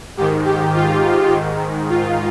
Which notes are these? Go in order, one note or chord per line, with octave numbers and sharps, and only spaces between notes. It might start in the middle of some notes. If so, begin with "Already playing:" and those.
G#2 D#3 G4
G4
F4
G#2 D#3
F4